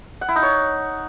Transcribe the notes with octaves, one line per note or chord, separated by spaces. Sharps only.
F#5
E4
D#4
C#5